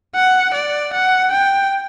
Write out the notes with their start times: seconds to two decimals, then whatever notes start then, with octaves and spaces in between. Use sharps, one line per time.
0.15 F#5
0.54 D5
0.93 F#5
1.31 G5